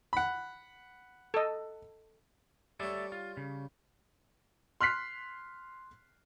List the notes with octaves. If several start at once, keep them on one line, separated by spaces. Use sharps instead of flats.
F#5 B5
A4 D#5
G3 A4 C#5 D5 E5
F4
C#3
C6 F6 F#6 B6 C7